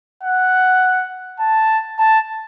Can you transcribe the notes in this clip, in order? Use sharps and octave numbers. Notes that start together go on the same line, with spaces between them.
F#5
A5
A5